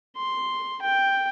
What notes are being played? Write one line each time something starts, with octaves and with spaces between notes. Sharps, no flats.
C6
G5